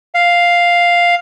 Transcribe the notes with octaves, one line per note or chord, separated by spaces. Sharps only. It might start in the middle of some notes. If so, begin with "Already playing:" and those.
F5